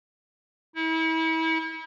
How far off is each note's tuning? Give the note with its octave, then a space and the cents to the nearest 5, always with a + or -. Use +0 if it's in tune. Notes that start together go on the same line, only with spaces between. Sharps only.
E4 -35